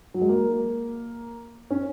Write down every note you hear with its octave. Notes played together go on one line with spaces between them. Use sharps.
F#3
G#3
A#3
C#4